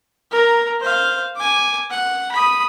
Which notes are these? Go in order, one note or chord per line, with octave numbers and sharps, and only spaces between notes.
A#4 A#5
C5 F5
G#5 D6
F#5
B5 D#6